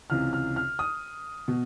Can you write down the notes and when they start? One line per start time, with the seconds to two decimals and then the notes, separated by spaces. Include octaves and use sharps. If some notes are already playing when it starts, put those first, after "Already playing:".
0.10 C#2 C3 E3 F6
0.33 F6
0.56 F6
0.79 D#6
1.48 B2